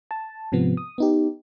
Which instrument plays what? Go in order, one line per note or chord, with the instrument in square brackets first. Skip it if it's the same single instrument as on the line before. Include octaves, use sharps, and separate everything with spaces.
[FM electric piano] A5
G#2 C3 F3 B3
D#6
B3 D#4 G4